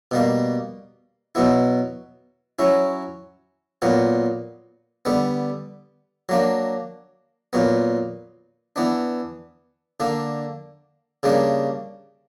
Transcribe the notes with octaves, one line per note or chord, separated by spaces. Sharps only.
B2 G3 A#3
B2 F#3 B3 E4
F#3 C#4 E4
A#2 F#3 B3
D3 G3 B3
F#3 A#3 D4
A#2 F#3 B3
E3 B3 D4
D3 A#3 D4
C#3 G3 A#3 D4